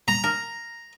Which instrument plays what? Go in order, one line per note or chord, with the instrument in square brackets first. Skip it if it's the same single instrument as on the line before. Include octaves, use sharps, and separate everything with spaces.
[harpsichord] A#5
[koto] A#4